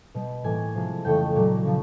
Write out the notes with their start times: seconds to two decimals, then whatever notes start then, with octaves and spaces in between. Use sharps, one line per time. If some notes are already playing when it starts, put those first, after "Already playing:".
0.14 B2 G3 B3
0.44 A2 E3 G3 A#3 G#5
0.75 C3 F3 G#3
1.05 F2 C#3 E3 A3 G5
1.35 A#2 F#3 A#3
1.65 C#3 F3